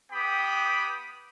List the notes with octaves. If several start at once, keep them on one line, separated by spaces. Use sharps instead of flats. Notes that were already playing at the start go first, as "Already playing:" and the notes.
B3 G4 G5 B5 D6 D#6